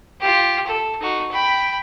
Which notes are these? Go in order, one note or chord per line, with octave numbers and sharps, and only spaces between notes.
F4 G4
A4
D#4 F#4
G5 B5